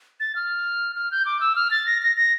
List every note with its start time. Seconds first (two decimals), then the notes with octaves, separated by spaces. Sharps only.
0.20 A6
0.36 F6
0.96 F6
1.11 G6
1.26 D6
1.40 E6
1.56 F6
1.71 A6
1.86 A#6
2.02 A#6
2.17 A#6